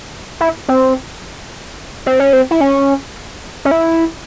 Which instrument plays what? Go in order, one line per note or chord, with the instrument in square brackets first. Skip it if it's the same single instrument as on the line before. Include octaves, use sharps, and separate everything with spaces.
[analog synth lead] E4
C4
C4
C#4
C4
E4
C#4
C#4
E4